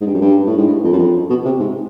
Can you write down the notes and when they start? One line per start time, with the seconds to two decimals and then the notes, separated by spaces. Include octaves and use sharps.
0.01 G#2
0.06 G2
0.14 F#2
0.21 G2
0.47 A2
0.58 G#2
0.67 G2
0.84 F2
0.93 F#2
0.98 F2
1.30 B2
1.45 C3
1.60 G#2